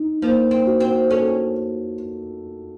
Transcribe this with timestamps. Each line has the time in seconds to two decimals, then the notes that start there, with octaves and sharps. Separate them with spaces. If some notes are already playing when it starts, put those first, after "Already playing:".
Already playing: D#4
0.22 F3 A#3
0.51 C4
0.67 F#4
0.80 C4
1.10 C#4 A4